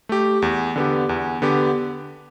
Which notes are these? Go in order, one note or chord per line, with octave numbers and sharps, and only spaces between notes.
A3 G4
E2
D3 B3 G4
E2
D3 B3 G4